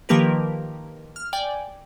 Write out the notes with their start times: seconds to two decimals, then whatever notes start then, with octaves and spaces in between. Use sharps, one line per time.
0.09 D#3 F3 A#3 G4 A#4 B4
1.16 F6
1.33 D5 G5 G#5